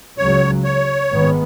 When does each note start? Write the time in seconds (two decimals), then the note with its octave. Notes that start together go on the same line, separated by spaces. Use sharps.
0.18 C#2 C#3 F#3 C#5
0.64 C#5
1.12 G#1 G#2 D#3 G#3 B3